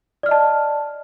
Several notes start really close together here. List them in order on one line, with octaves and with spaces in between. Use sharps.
D5 F6 D#5 A5